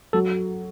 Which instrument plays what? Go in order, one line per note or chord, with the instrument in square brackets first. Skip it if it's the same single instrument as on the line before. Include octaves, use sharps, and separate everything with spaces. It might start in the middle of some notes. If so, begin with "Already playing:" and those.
[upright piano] F#3 [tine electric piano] A4